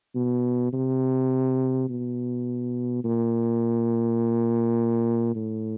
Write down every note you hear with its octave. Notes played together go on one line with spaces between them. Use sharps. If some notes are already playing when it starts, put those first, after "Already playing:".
B2
C3
B2
A#2
A2